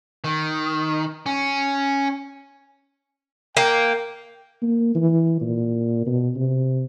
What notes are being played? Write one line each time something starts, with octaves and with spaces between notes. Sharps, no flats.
D#3
C#4
A#3 G5
A#3
E3
A#2
B2
C3